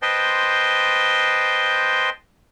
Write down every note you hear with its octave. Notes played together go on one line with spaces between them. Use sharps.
B4 C5 D#5 G5 A5 C6